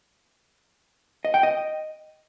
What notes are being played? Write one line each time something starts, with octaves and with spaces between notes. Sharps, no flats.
D#5
G5
D#5